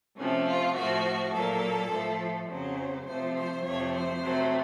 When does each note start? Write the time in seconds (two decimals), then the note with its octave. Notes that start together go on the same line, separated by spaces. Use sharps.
0.17 C3 F3 A3 C#4
0.47 F4
0.75 A2 F3 A3 F#4
1.33 A#2 F#3 A#3 A4
1.91 A2 F3 A3
2.48 F2 C#3 F#3 C5
3.06 C3 F3 A3 C5
3.36 C5
3.64 F2 C3 F3 A3 C#5
3.93 C5
4.22 C3 F#3 A3